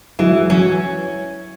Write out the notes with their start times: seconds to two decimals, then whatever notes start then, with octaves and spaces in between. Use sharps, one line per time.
0.19 E3 F#3 G#3
0.50 F#3 C#4